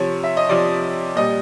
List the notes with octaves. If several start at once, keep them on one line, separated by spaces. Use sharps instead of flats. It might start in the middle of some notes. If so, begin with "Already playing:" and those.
Already playing: C3 F3 C#5
E5
D#5
C3 F3 D5
A#2 G3 D#5